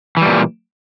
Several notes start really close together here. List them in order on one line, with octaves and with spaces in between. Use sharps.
E3 G3 A#2